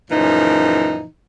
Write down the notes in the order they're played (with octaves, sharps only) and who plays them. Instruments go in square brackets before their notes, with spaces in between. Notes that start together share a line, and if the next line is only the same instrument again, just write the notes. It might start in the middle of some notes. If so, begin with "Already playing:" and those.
[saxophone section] F#2 A#2 C#3 E3 F3 D#4